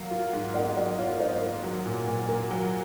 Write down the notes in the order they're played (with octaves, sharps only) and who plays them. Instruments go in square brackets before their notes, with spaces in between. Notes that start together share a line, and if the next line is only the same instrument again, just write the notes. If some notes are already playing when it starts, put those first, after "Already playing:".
Already playing: [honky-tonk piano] F#3 A#3 [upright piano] F5
[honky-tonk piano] F4
G#2
[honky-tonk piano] A#3 [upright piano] D#5 F#5
[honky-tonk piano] F#3 [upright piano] D#5 F#5
[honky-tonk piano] F4 [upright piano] C#5 F5
[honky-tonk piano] G#2 [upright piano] C5 D#5
[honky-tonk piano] A#3
F#3
A#2
A#2
A#3
F#3